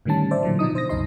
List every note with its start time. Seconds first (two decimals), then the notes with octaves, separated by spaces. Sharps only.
0.05 A2 D3 D#3 G3 C#4 A5
0.31 C5 D5 E5
0.43 A#2 D3 E3 F#3
0.59 B2 F3 D#4 D#6
0.74 B2 C5 D#6 A#6
0.89 C2 F#2 B2 D#4 D#5 C6